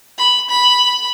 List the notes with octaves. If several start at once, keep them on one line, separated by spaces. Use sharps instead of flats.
B5
B5